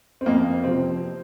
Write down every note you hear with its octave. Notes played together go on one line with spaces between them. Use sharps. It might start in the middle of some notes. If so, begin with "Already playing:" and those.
C4
F2 A#3
C3 F3 C4